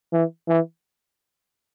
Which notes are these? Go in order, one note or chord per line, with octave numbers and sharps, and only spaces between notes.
E3
E3